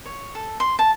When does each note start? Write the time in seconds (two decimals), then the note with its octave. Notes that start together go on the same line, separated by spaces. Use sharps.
0.05 C#5
0.35 A4
0.60 C6
0.79 A5